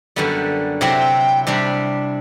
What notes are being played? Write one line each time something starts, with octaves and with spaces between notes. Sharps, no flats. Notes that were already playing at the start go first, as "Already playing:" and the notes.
F#2 D3 G3 B3
C3 F#3 C4 E4 G5
C3 G3 D4